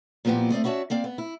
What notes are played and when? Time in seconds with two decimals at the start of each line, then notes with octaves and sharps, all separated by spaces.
0.25 A#2 F3 A#3 B3 E4 G4
0.50 A3 C4 D5 D#5
0.64 B3 C#4 F#4 D5 E5 A5
0.90 A#3 C4 D5 F5
1.04 B3
1.18 E4